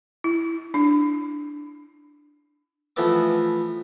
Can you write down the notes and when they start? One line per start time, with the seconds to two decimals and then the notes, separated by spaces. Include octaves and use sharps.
0.24 E4
0.74 D4
2.96 E3 F3 A3 B3 D6